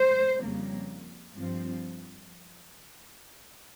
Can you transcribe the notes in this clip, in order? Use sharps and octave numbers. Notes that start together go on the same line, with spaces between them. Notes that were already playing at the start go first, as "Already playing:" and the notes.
Already playing: C5
F2 C#3 G3 A#3
G2 F3 C4